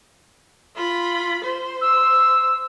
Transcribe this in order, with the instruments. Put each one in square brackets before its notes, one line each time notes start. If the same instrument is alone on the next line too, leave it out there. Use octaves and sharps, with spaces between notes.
[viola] F4 B5
C5
[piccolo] E6